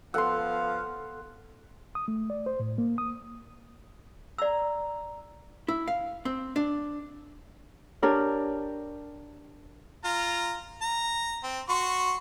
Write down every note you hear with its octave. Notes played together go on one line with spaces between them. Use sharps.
F3 B3 A4 F5 F#5 C6 E6
D#6
A3
D5
C5
A2
A#3
D#6
D5 A#5 E6
E4
F5
C4
D4
D4 G4 A#4 C#5
F4 A#5
A#5
C4
F#4 C6 C#6